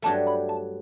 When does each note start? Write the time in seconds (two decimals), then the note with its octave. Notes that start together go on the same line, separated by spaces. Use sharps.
0.02 G2 F#3 A3 D4 G4 A5
0.27 B5
0.49 A5